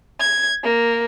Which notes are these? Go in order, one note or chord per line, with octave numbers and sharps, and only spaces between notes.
G#6
A#3